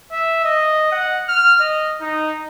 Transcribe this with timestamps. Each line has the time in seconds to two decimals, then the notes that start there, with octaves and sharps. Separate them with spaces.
0.12 E5
0.45 D#5
0.92 F#5
1.29 F6
1.60 D#5
2.01 D#4